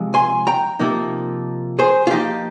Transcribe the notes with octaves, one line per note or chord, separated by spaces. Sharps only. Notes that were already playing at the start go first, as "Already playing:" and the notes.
Already playing: C3 F3 G#3
G#5 C6
G5 A#5
C3 F3 A#3 D#4
G#4 C5
F4
F3 A#3 D#4 G4